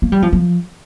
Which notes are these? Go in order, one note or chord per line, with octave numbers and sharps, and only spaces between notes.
A#3
G3
F3
F3